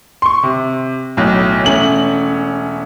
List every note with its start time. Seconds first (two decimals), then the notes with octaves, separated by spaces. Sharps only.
0.22 C6 C#6
0.43 C3
1.17 B1 A2
1.64 E1 A3 C#4 F#7